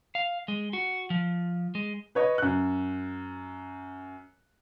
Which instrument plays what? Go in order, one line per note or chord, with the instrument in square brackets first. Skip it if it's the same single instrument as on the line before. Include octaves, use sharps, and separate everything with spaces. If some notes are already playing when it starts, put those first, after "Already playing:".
[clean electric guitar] F5
G#3
F#4
F3
G#3
[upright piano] B4 C#5 D#5
F#2 F#6